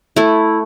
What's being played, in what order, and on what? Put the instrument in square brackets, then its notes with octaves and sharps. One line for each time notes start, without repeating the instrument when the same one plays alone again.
[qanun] A3 E4